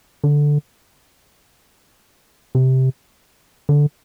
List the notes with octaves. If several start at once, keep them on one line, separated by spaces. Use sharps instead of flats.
D3
C3
D3